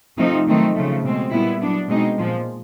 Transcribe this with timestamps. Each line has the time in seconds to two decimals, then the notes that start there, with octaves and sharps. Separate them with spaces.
0.18 C3 F3 A3 C4 D#4
0.47 D#3 F#3 A3 C4 D#4
0.75 C#3 F3 A3
1.03 B2 G#3 C4
1.31 A#2 G3 B3 E4
1.60 F#3 B3 D4
1.88 B2 G#3 C4 D#4
2.17 A#2 F3 G#3